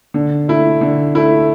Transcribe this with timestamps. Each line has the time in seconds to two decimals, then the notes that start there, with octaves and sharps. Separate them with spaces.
0.14 D3
0.48 A3 E4
0.81 D3
1.15 A3 E4